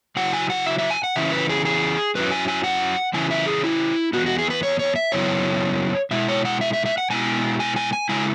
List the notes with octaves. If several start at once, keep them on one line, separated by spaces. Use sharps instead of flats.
C#3 F#3 E4 F#5
G#5
F#5
E5
E5
G#5
F#5
C#3 E3 C#4 E4 E5
B4
G#4
G#4
F#2 F#3 C#4 E4 B4
G#5
G#5
F#5
C#3 E3 C#4 E4 G#5
E5
G#4
E4
E2 B2 B3 F#4
F#4
G#4
B4
C#5
C#5
E5
F#2 C#3 F#3 B3 E4 C#5
B2 G#3 E4 E5
C#5
F#5
E5
E5
E5
F#5
B2 G#3 B3 E4 G#5
G#5
G#5
G#5
C#3 G#3 E4 G#5